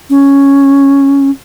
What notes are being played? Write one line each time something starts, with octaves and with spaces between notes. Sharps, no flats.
C#4